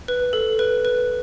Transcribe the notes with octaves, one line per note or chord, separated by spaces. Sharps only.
B4
A4
B4
B4